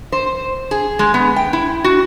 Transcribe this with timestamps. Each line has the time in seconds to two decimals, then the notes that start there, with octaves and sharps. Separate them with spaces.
0.12 C5
0.71 G#4
0.99 G#3
1.14 B3
1.36 G5
1.53 E4
1.84 F#4